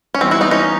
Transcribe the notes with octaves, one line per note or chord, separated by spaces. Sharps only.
C#4
E3 G3 B3 C4
E4 F#4
D#4 F4
C#4 D#4